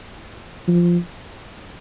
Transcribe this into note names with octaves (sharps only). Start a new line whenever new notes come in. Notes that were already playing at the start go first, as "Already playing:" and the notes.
F3